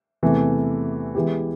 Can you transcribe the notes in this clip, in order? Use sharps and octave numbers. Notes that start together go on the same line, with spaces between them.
E2 C3 E3 A3
E3 G#3 B3 E4 G4